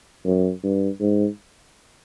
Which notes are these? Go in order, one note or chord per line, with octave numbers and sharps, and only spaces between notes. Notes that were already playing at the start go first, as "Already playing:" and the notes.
F#2
G2
G#2